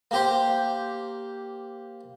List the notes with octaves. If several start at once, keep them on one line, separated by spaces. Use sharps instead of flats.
A#3 G4 C5